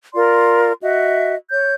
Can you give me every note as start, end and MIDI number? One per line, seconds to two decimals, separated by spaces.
0.14 0.73 65
0.14 0.73 70
0.14 0.73 74
0.14 0.73 84
0.82 1.35 66
0.82 1.35 75
0.82 1.35 76
1.50 1.74 73
1.50 1.74 91